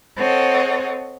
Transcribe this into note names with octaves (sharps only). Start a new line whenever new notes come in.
C4 A4 C#5 D#5 F#5